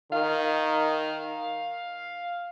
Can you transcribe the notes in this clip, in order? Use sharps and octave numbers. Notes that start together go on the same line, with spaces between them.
D#3 F5